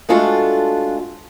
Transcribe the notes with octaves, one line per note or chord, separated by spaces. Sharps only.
G#3 A3 D4 F4 F#4 A4